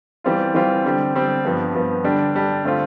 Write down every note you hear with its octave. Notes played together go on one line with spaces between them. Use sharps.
E3 G3 C4 F4
E3 G3 C4 F4
D3 G3 C4
D3 G3 C4
G2 F3 B3
G2 F3 B3
D3 G3 D4
D3 G3 D4
D3 A3 C4 F4